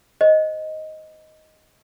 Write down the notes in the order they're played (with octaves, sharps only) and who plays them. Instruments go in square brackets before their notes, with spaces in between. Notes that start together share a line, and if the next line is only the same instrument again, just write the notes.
[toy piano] C5 D#5